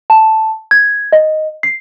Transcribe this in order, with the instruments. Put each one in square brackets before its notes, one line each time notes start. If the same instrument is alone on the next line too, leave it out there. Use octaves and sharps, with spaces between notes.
[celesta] A5
G#6
D#5
C7